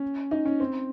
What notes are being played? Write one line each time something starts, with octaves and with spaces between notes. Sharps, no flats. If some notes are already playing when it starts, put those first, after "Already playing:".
Already playing: C#4
D#4
C#4
C4